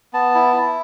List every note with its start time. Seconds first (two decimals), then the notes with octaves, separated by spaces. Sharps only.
0.13 B3 A5
0.35 E4
0.56 E4